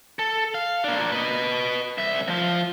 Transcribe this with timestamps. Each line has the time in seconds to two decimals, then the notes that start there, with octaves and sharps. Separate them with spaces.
0.19 A4
0.54 F5
0.84 A#3 D4
1.12 B4 D#5
1.98 C2 E5
2.28 F3 F4